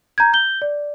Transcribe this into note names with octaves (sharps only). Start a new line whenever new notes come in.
A#5 G6 G#6
G6 G7
D5